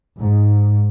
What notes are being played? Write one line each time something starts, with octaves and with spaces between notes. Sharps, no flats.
G#2